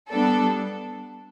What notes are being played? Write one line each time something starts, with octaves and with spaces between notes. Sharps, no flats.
G3 B3 D4 A4